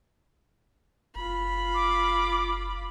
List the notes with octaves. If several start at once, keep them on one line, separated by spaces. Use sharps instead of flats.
F#1 F4 B5
D6